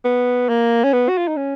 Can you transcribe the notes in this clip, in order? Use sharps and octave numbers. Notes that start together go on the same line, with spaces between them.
B3
A#3
C#4
B3
F#4
F4
D#4
C#4